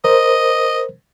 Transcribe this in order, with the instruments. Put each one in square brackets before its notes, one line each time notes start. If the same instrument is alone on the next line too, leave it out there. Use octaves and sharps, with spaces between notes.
[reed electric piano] A#4 C5 [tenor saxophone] D#5